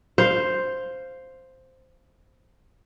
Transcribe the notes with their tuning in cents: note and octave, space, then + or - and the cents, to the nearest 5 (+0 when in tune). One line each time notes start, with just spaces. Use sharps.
C5 +0 F5 +0